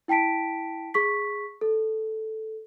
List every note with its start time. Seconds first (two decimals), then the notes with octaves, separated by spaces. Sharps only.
0.08 E4 G5 A5 B6 D7
0.94 G#4 C#6 B6
1.61 A4